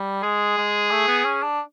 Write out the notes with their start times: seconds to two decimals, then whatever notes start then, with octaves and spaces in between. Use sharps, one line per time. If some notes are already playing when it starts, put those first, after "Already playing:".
Already playing: G3
0.23 G#3 G#4
0.58 G#3
0.91 A3
1.08 B3
1.25 C#4
1.43 D4